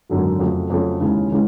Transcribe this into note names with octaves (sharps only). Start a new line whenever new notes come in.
G#1 F#2 D3 F#3
F2 C#3 F#3 A3
F2 C#3 F#3 A3
D#2 C#3 E3 G#3 C#4
C#3 E3 G#3